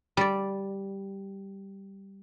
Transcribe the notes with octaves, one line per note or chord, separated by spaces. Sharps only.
G3 D5